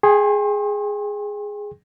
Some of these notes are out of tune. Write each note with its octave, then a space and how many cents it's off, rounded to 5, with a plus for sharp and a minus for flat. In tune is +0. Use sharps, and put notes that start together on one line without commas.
G#4 +0 G5 +30 C6 +40